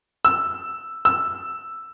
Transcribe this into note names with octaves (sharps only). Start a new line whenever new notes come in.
E6
E6